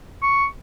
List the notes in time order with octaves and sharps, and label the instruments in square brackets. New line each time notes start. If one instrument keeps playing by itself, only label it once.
[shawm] C#6